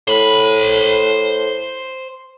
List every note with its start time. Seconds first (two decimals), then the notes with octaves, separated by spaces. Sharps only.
0.07 A2 C5 B5